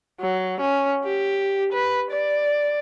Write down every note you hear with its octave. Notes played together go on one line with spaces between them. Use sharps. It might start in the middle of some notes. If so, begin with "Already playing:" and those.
F#3
C#4
G4
B4
D5